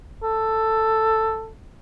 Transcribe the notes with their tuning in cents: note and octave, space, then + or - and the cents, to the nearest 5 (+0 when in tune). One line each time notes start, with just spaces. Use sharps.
A4 +5